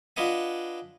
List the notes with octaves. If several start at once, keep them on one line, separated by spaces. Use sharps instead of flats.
D4 F4 B4 D#5 F#5 G#5